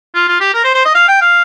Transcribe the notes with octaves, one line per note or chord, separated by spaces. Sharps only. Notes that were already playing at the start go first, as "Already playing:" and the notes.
F4
F4
G4
A#4
C5
C5
D#5
F5
G5
F5